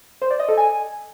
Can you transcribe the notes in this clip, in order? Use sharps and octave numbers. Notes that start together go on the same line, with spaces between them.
C5
D5
D#5
A4
G#5